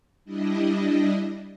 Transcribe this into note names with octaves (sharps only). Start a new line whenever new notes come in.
G3 D4 E4 D#5